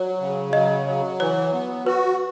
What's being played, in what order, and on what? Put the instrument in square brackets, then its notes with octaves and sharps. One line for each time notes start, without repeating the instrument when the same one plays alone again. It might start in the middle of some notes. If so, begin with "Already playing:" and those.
Already playing: [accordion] F#3 [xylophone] C#5
[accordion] C#3
[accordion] F#3 [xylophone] D#5
[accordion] F#3
[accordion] E3 [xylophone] C#5
[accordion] B3
[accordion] F#4 [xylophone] B4